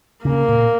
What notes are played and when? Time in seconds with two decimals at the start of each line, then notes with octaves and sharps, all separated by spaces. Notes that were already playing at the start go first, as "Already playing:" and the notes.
0.25 C#3 A#3
0.49 A#2